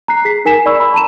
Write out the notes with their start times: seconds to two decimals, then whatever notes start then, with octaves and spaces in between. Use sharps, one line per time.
0.08 A#5 F#6 C7
0.25 G#4 B6 C7
0.45 D#4 A#4 G#5 B6 E7
0.66 D5 B5 C#6 E6
0.80 B5
0.94 A5 A#5 D#7 E7